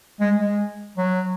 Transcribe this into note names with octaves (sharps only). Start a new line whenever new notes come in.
G#3
G#3
F#3